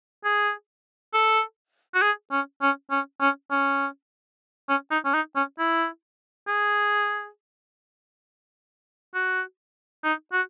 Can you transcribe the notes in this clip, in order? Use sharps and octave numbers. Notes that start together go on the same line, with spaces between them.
G#4
A4
F#4
G#4
C#4
C#4
C#4
C#4
C#4
C#4
D#4
C#4
D#4
C#4
E4
G#4
F#4
D#4
F#4